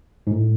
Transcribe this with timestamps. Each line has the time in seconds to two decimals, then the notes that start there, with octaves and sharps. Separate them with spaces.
0.27 G#2
0.31 A2